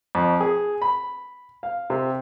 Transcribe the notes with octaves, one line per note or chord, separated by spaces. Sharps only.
F2
G#4
B5
F5
C3